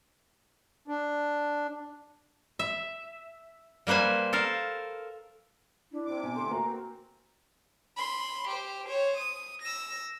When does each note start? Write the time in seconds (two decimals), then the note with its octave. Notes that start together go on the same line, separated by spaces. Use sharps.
0.88 D4
2.59 E5
3.87 G3 A#3 B4 C5 G#5
4.33 A4 A#4 F5
5.92 D4 E4
6.06 C3 D6
6.23 B2 G#5
6.36 D3 A3 C6
6.51 A#3 F#4 A#4 A#5
6.64 C4
7.96 B5 C6
8.48 G4 C5
8.86 C5 C#5
9.17 D#6
9.62 E6 A#6